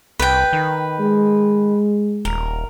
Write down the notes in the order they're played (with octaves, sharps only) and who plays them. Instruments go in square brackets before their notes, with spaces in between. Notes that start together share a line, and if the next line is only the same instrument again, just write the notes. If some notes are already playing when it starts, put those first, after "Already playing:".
[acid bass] C2 [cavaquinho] B4 G5
[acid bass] D#3
[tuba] G#3
[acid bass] D#1 [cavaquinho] A#4